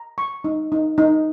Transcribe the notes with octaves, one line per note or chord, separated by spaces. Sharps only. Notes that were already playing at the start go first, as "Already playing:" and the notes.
Already playing: A#5
C#6
D#4
D#4
D#4